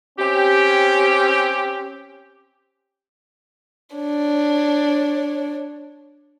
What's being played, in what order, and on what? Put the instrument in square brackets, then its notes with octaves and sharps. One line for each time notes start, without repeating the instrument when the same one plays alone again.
[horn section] C4 C#4 G4
[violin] D4 C#5